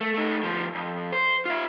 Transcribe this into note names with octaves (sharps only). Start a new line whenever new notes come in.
A3
A3 D#4
D2 F3
F2
C5
F4 E5